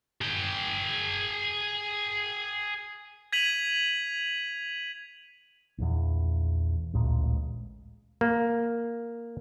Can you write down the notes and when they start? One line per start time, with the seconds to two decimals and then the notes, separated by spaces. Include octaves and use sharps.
0.21 G#4 G5
3.32 G#6 B6 D#7 F7 F#7
5.78 A#1 E2
6.94 A1 D2 A#2 G#3
8.21 A#3